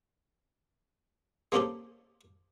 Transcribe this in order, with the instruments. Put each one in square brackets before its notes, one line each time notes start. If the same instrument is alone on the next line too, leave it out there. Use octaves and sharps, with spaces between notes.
[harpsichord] G#3 A#3 C4 C#4 G4 A4